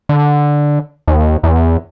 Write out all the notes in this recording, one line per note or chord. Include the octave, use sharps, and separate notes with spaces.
D3
D#2
E2